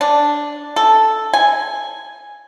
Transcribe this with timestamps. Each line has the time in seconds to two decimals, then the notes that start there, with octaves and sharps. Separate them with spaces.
0.01 D4
0.76 A4
1.33 G#5